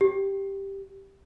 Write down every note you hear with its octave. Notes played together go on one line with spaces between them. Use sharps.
G4